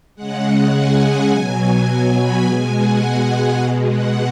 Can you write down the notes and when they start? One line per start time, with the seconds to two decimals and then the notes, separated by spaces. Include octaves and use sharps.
0.16 C#3 G#3 F#5
0.44 F#5
0.73 G#5
1.30 B2 F#3
1.87 G#5
2.17 B5
2.45 B2 G#3 G#5
2.73 F#5
3.59 B2 G#3
3.87 F#5